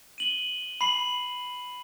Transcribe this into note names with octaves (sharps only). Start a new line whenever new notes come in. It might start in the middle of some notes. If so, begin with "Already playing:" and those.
D#7 F#7 G7
B5 C7 F#7